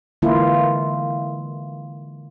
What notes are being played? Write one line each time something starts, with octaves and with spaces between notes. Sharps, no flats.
D3 E3 G#3 A#3 E4 F4